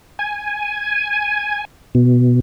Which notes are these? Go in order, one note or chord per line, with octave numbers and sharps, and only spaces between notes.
G#5
B2